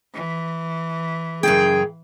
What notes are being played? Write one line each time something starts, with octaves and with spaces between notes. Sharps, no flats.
E3
F#2 C#3 G#4 G5